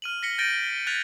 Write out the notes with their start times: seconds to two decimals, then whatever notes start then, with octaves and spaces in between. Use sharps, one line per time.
0.02 F6 D#7 F#7
0.23 A#6 B6 C#7 G7
0.38 G6 A6 A#6 D7 D#7 G7
0.87 F#6 G#6 A6 B6 F7